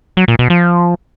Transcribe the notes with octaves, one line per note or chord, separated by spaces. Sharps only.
F#3
A#2
B2
F3